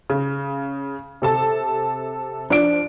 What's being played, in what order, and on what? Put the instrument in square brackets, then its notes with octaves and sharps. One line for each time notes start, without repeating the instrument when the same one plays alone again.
[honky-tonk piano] C#3
C3 A4 A5
[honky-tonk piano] F3 [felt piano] D4 D7